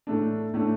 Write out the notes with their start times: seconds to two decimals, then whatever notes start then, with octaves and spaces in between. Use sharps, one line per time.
0.07 A2 A3 D4
0.54 A2 A3 D4